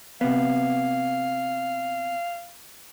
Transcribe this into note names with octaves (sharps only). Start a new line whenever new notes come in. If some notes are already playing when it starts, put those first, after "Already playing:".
C3 B3 F5